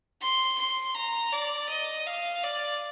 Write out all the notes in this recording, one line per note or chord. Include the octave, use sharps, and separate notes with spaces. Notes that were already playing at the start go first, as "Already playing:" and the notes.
C6
C6
A#5
D5
D#5
F5
D5